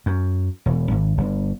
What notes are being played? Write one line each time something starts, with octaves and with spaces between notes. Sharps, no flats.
F#2
E1
G#1
G1